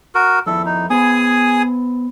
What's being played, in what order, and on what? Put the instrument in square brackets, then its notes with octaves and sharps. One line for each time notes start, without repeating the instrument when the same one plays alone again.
[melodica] F#4 A#4
[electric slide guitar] F2 E4 [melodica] A4
[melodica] D#4
[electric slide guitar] B3 C5 [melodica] G#4 G#5 D#6